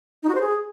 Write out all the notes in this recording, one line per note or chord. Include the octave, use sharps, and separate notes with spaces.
D#4
F#4
C5
G#4